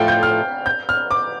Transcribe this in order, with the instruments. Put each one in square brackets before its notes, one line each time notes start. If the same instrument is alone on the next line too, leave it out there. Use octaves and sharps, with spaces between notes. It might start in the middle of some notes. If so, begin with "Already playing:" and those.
Already playing: [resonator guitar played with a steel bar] A2 F3 A3 F4 A4 [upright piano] F5 G5
[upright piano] G6
F6
G6
F6
D6